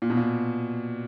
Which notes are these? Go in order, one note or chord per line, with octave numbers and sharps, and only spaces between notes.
A#2
B2
A#2